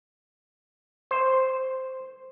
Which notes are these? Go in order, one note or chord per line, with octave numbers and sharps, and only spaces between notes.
C5